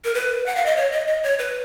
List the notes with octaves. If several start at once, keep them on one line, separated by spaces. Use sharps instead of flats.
A#4
B4
F#5
F5
D#5
C#5
D#5
D#5
C#5
B4